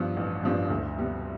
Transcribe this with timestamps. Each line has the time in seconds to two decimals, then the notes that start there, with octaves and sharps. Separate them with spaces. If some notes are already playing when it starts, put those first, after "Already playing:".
Already playing: G2 F3 B3 D4
0.17 A1
0.43 G2 F3 B3 D4
0.70 D2
0.98 C3 G3 B3